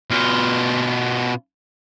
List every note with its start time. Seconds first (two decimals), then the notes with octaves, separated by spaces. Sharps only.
0.10 B2 F4